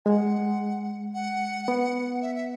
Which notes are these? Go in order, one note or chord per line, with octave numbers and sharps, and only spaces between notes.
G#3 F#5 G#5
F#5
B3
E5
E5